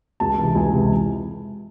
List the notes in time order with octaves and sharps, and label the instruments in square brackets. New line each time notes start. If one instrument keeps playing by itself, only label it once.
[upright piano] C#2 A5
C3 E3
C#2 G#5
C3 E3